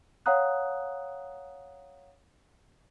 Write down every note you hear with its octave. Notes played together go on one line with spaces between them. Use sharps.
C#5 F5 F#5 A#5 D#6 F#6